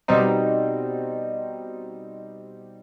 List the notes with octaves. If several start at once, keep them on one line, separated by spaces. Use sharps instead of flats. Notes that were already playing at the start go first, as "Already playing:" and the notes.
B2 G3 C4 D#4